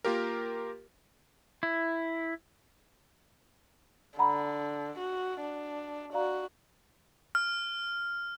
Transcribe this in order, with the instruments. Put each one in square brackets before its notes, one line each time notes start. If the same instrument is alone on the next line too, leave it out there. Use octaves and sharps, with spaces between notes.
[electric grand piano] A#3 F4 G4 A#4
[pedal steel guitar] E4
[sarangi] D3 [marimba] F#5 A#5 B5
[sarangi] F#4
D4
[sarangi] F#4 [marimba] D5 F5 A#5
[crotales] F6